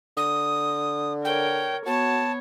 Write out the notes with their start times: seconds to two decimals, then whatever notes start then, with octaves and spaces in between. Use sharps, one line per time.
0.17 D3 D#6
1.25 A#4 C#5 G5
1.86 B3 F#4 C#5 A5